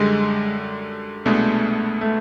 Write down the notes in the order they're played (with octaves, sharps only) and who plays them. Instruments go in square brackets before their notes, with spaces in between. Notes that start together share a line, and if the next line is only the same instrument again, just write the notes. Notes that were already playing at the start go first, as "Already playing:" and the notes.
Already playing: [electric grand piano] F#2 D3 G3 [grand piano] G#3
[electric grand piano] C2 B2 G#3 B3 D4 [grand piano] A3
[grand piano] A3